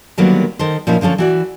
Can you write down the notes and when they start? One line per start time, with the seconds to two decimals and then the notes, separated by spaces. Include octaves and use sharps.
0.18 D3 D#3 F#3 G3 A#3 B3
0.59 D#3 A4 C5
0.87 A#2 F3 C#4 D#4 E4
1.01 D3 F3 C#4 A4 C#5
1.18 E3 F#4 D5